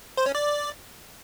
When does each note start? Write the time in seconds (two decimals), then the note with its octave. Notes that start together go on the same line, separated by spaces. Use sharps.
0.17 C5
0.26 C#4
0.35 D5